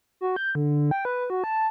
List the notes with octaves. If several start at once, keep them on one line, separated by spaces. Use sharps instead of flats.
F#4
G6
D3
G5
B4
F#4
A5